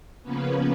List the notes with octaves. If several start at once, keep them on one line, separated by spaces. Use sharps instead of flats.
C#3 F3 A#3 B3 C#4 B4